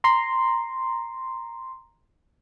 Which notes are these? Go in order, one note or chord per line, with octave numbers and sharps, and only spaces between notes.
A#5 C6